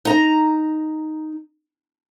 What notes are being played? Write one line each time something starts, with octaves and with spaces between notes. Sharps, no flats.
D#4 A#5